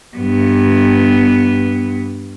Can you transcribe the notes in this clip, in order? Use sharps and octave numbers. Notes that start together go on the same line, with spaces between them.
G2 B3